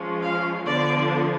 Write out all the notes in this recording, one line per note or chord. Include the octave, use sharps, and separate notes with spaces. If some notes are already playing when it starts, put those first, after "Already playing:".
Already playing: F3 G#3 C#4
F5
D3 F3 B3 D4 D5